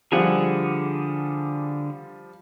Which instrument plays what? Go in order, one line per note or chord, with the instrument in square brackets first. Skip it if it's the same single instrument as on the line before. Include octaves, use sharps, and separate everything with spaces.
[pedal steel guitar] D3 G#4 F#5 [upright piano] F3 G3